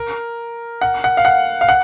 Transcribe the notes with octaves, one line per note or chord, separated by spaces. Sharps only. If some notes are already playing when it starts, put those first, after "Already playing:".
Already playing: A#4
F#5
F#5
F5
F#5
F5
F#5